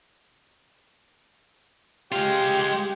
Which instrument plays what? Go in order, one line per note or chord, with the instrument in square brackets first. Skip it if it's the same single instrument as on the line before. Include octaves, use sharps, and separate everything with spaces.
[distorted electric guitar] G#3 F4 [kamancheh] G4